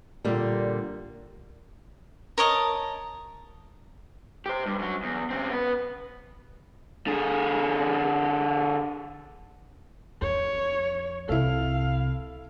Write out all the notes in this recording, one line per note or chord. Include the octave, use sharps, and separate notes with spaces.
A#2 D3 G3
A#4 C#5 D#5 A5
G4 C5
G2
F#2 F#3
E2
C#3 C4
B3 B4
D3 G#4
F2 C#5
C2 C3 E4 A4 F5